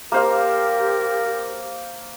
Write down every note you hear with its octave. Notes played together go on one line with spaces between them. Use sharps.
A#3 G4 A#4 C5 F5